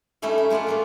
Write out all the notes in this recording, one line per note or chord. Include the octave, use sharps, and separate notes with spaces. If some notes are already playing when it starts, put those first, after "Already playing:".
G3 A3 C#4 D#4 E4
E4
G#3 A3 F4 D5 F#5
G3 A#3 B3